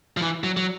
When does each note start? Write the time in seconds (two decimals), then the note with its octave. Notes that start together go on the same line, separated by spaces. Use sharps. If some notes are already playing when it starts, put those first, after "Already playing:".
0.17 F3
0.22 E3
0.44 F#3
0.57 F#3